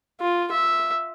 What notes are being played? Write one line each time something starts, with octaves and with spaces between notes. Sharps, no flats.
F4
E5